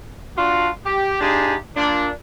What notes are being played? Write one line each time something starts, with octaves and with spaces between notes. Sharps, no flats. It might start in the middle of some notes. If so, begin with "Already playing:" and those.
D4 F4 F#4
G4
D4 D#4 F4 G4 G#4
A#2 D4